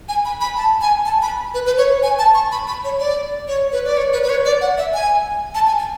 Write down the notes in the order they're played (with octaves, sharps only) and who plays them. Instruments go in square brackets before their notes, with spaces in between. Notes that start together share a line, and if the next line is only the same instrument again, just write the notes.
[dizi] G#5
B5
B5
A5
G#5
A5
B5
B4
B4
C#5
G#5
A5
C#6
B5
B5
C#5
D5
C#5
B4
D5
C#5
B4
B4
C#5
D5
F#5
E5
G#5
A5
G#5
G#5